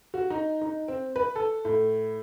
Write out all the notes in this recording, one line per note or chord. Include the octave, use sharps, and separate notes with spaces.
F#4
D#4
D#4
C4
B4
A4
A2